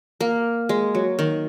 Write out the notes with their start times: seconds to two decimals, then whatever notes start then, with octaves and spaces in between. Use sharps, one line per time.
0.21 A#3
0.69 G#3
0.95 F#3
1.19 D#3